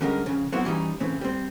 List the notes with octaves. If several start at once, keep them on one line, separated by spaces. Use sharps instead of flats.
D3 G3 G#3 C#4 G#4 A#4
F2 C#3
F#3 B3 C4 E4 F#4
E3 G3 C#4 D#4
A2 C#3 E3 C4
G3 C4